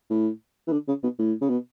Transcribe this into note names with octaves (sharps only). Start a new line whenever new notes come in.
A2
E3
D3
C#3
B2
A2
C#3
B2